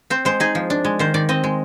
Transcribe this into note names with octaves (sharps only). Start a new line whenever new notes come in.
C4 C5
G#3 C5
D#4 G#4
F3
D4
G#3
D#3 C5
D#3 D5
C4 D#5
G#3